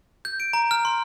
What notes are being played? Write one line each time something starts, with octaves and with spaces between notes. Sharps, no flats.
G6
D7
A#5
F6
C6